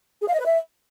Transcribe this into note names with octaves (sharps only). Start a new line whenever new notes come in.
G#4
F5
D#5
B4
E5